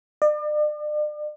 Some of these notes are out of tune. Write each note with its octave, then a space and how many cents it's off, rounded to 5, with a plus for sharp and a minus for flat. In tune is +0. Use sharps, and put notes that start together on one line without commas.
D5 +40